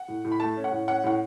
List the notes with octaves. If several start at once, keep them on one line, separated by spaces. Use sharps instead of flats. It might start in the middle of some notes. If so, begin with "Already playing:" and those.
Already playing: F#5
A2
A2
B5
A3 A5
C#4
F#5
A2
C#4 F#5
A2 F#5